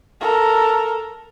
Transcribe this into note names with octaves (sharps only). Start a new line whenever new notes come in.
A4 A#4